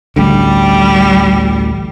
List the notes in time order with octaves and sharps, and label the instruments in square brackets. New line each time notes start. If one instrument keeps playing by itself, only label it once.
[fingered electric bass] A1 D2 D3 [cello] G3